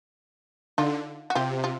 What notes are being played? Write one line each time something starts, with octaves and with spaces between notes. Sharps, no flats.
D3 D#4 F4
F#4
C3 F4 G4
F4